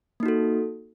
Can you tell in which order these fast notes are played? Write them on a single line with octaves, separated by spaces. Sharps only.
A#3 D#4 F#4 A4